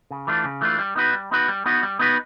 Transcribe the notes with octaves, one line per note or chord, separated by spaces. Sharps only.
C#3
E3 A3 D4 F4
C#3
E3 A3 D4 F4
G3
B3 D#4 F#4 B4
G3
B3 D#4 F#4 B4
G3
B3 D#4 F#4 B4
G3
B3 D#4 F#4 B4